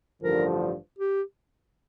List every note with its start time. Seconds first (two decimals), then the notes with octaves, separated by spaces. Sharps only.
0.22 A1 G2 D3 F3 A#4
0.98 G4